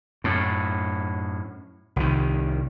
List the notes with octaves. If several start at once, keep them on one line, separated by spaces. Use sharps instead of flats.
F#2 A2
C2 D#3